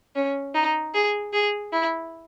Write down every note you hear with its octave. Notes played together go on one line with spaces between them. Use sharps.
C#4
D#4
G#4
G#4
E4